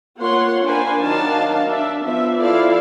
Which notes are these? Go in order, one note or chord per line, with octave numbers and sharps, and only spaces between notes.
A#3 F4 C#5 F#5 C6
D4 A#4 C5 F5 G#5 B5
D#3 F#3 D4 D#4 F5 A5
D4 E5
F3 B3 E5
F3 E4 A4 D5 F5